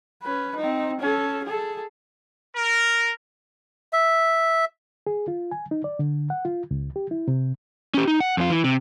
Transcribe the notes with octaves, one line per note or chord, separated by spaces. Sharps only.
C#4 B4
C4 D#4
C#4 A4
G#4 A4
A#4
E5
G#4
F4
G#5
D#4
D5
D3
F#5
F4
C#2
G4
E4
C3
C#4 G4
D#4
F#5
F2 F4
E3
C3